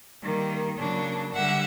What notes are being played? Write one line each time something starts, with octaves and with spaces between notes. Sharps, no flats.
D#3 G3 A#3
C#3 F#3 A#3 D4
D3 G3 E5 F#5